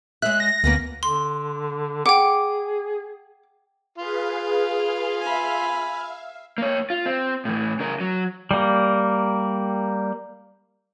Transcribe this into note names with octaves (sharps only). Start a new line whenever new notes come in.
G#3 C#5 E5 F#6
A#6
D2 A#3 B3 C#4
D3 C6
G#4 F#5 G5 D6
F4 G#4 B4 F5
E5 F5 G#5 B5
A#3 C#5
F4
C4
A2 E3
C#3 A#4
F#3
G3 A#3